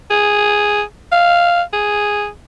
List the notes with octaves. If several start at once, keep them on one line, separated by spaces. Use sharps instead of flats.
G#4
F5
G#4